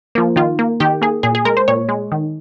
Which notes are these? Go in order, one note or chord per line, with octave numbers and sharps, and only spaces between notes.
F3 A#3
D#3 F4
A#3
D#3 G4
A#3 G#4
A#2 G#4
G#4
G#3 A#4
C5
A#2 C#5
G#3
D#3